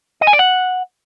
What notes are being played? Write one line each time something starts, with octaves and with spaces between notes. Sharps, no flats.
D#5
G#5
D5
F#5